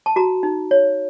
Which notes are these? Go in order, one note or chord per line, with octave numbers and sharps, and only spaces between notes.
A5
F#4 A#5
D#4
C#5